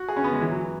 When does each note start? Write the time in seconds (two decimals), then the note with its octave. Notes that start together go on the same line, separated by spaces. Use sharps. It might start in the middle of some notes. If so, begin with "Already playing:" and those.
Already playing: F#4
0.08 G#4
0.17 C#4
0.24 B3
0.32 G#3
0.41 E3
0.51 F#3
0.63 F#3